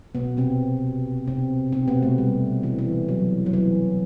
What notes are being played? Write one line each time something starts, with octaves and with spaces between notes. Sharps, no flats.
B2 B3
C3 C4
C3 C4
C3 C4
B2 B3
A3
G3
E3
E3
F#3
F#3
E3